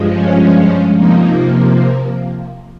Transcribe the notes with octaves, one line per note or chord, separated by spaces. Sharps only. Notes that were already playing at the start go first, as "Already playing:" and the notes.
Already playing: G2 F3 G#3
C#4
C3 F3 A#3 D#4